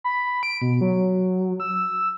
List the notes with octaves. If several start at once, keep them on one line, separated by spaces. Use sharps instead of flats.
B5
D7
B2
F#3
E6